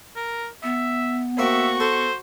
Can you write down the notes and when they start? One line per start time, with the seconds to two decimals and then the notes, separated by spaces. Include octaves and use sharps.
0.16 A#4
0.63 B3 E5
1.39 A#3 C4 F#4 E5 C#6
1.80 A4 C5